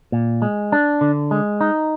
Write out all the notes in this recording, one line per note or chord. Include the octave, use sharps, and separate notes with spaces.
A#2
G#3
D4
D3
G#3
D#4